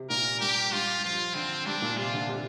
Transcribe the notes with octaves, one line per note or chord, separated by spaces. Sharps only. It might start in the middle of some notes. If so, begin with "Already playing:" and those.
Already playing: C3
A#2 A#4
G2 G4
G2 F4
F3 F4
D3 C4
G2 D4
A#2
C3 F4
D3
C3